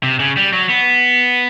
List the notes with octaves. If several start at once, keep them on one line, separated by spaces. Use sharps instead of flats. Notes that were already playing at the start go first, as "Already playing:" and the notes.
C3
C#3
G3
F#3
B3